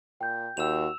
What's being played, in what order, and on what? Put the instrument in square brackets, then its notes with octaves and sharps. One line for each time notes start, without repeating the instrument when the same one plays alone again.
[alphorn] A#2 [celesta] G5 G6
[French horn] D#2 [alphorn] F#4 [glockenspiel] E6 E7 F7